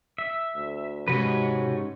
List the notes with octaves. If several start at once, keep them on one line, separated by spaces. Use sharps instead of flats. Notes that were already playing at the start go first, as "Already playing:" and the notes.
E5
D2
F2 G#2 C3 C#4 F#4 G4 B4